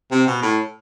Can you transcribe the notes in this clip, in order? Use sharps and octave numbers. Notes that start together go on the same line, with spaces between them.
C3
B2
A2